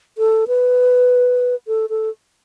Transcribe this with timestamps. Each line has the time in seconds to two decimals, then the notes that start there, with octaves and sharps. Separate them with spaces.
0.18 A4
0.48 B4
1.68 A4
1.90 A4